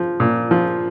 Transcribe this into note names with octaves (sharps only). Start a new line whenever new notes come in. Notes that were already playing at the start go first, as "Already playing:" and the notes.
Already playing: F3
A#2
F3